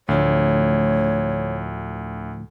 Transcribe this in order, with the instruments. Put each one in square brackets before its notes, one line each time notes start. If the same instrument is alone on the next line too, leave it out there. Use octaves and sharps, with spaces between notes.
[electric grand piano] D2 [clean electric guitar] A2 D3 F3 [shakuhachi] C#5